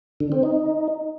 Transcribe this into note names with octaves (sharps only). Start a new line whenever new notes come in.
D3
C4
D#4